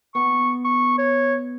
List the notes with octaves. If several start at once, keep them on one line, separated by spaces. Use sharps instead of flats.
B3 C#6
C#6
C#5